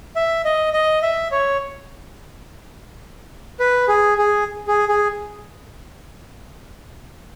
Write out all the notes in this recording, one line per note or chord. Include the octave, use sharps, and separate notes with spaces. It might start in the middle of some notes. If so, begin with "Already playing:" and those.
E5
D#5
D#5
E5
C#5
B4
G#4
G#4
G#4
G#4